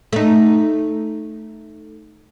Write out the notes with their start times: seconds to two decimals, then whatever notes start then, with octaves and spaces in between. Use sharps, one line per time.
0.13 A3 D#4